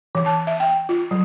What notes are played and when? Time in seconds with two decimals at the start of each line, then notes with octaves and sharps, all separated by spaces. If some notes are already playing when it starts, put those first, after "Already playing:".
0.15 E3
0.26 A5
0.47 E5
0.60 G5
0.89 F4
1.11 F#3